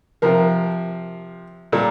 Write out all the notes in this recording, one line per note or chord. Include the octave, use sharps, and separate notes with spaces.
C3 F3 A#4
A#2 G3 A4